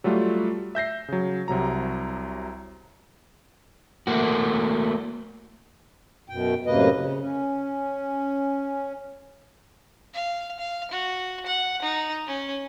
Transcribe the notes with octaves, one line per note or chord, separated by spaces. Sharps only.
F#3 G3 A3 F4
E5 G6 A#6 C7
C#3 F#3
C2 C3 F#3 A#5
A3 A#3 F#4
F#2 B2 G5
F#2 A2 C3 A#3 B4 D#5
C#3
C#4
F5
F5
F#4
F#5
D#4
C#4